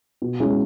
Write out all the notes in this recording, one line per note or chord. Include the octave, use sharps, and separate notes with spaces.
B2
G#3 C#4 E4